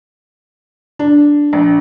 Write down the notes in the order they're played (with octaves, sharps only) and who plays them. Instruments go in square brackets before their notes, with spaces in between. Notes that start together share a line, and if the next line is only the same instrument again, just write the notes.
[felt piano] D4
A#1